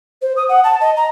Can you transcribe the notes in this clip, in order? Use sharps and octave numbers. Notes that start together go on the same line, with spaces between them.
C5
D#6
F#5
A5
D#5
A#5